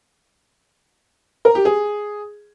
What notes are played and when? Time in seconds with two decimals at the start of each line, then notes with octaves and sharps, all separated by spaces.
1.45 A#4
1.55 G4
1.65 G#4